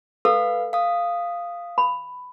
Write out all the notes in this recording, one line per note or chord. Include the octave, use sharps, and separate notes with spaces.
A4 B4 F5 E6
F5 D#6
B5